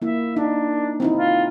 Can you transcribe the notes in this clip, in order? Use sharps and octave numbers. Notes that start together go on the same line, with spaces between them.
A#3 E4 E5
D4 D#4
C4 D#4 E4
F4